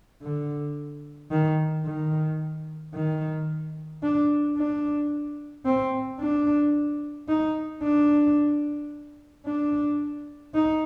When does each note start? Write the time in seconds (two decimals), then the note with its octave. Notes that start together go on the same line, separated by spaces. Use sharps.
0.22 D3
1.31 D#3
1.85 D#3
2.94 D#3
4.03 D4
4.57 D4
5.66 C4
6.20 D4
7.28 D#4
7.83 D4
9.46 D4
10.54 D#4